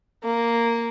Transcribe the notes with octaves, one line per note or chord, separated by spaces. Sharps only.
A#3